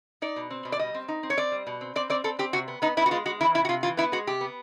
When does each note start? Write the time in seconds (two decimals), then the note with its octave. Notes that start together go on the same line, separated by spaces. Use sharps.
0.22 D#4 D5
0.36 B2
0.51 C4
0.65 B2
0.72 D5
0.79 G3 D#5
0.94 C4
1.08 D#4
1.23 C4
1.30 C#5
1.37 C4 D5
1.52 G3
1.67 B2
1.81 C4
1.96 C4 D5
2.10 C4 D5
2.24 C4 A4
2.39 C4 G4
2.53 C3 F#4
2.68 B3
2.82 B3 D#4
2.97 B3 E4
3.06 F#4
3.11 G#3 F4
3.26 G#3 F#4
3.41 E3 E4
3.55 C3 E4
3.65 F#4
3.69 C3 F4
3.83 E3 F4
3.97 B3 E4
4.12 G#3 F#4
4.27 C3 G4
4.41 B3